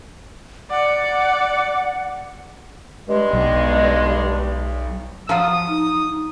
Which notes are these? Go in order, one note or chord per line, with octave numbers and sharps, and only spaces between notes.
D5 F#5
G2 G#3
B1
F3 F#3 F4 D#6
D#4